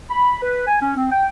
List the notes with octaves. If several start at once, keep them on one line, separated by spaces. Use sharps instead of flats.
B5
B4
G#5
C#4
C4
G5